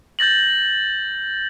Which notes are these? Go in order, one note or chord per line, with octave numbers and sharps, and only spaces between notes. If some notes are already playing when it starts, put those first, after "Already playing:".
G6 A6 A#6 F#7